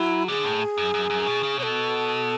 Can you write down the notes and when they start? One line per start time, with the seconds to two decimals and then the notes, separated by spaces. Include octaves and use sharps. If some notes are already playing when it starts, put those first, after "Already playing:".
Already playing: F#3 E4
0.28 D3 G#4
0.45 A2
0.78 F#2
0.94 F#2
1.10 F#2
1.27 B2
1.43 C#3
1.59 B2 C#5
1.63 A4